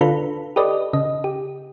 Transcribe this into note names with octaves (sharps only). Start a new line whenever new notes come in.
D3 D4 F4 A4 B4 B5
G4 A4 B4 D5 D#5
C#3 D#5
G4